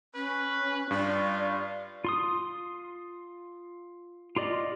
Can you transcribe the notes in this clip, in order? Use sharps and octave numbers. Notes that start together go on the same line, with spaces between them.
C#4 B4
G2 F4 D5
F4 C6 D#6
F4 G4 D5 D#5